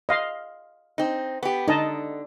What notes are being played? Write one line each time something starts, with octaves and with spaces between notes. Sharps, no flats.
D#5 F5 C6
C4 D#4
B3 G4
D3 D#4 D#5 A5